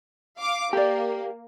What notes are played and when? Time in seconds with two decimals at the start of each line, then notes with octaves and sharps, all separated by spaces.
0.39 F5 D6
0.73 A#3 G4 D5